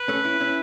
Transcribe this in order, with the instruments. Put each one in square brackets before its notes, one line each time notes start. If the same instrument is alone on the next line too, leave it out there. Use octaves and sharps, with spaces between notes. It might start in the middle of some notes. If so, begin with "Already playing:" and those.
Already playing: [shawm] B4
[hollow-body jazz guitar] A3 C#4
C#4 E4
C#4 E4